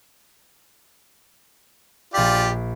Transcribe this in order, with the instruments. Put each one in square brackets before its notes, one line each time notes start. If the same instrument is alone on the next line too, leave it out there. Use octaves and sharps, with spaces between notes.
[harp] A#1 B6 [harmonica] F4 G4 D5